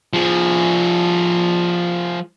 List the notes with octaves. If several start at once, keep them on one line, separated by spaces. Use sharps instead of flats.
F3 G#4